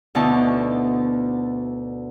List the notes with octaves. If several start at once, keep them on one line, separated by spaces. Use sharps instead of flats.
D2 B2 D3 D#4 E4 A5